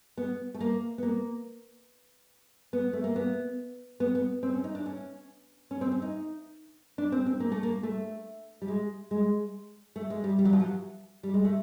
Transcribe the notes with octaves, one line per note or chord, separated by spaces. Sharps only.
B3
A3
A#3
B3
A#3
B3
A3
A#3
B3
B3
B3
C4
C#4
D#4
D4
C#4
C#4
C4
C#4
D#4
D4
C4
C4
A#3
A3
A#3
A3
G3
G#3
G#3
A3
G#3
G3
G3
F#3
F3
F#3
G3
G#3
A3